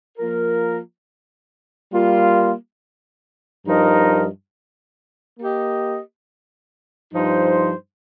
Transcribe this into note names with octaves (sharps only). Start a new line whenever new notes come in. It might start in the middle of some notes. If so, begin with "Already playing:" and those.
F3 A#3 F4 A#4
G3 A#3 F4
G2 F3 D#4 A#4 D#5
A#3 G4 D#5
G2 F3 D#4 C5